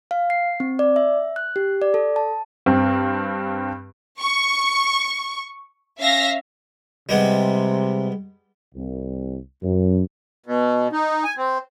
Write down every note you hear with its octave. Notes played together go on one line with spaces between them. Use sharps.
F5
C7
C4
D5
E5
F#6
G4
D5
A4
A5
G2 C4
C#6
C#4 E5 F5 A#6
C3 G3 G#3 B3
C2
F#2
B2
D#4
G#5
C4